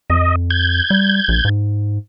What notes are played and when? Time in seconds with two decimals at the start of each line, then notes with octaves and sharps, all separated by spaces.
0.10 F2 D#5
0.50 G6 G#6
0.90 G3
1.28 A#1
1.45 G#2